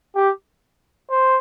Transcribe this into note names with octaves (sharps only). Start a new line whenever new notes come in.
G4
C5